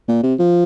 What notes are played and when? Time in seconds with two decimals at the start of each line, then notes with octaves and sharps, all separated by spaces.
0.08 A#2
0.23 C3
0.39 F3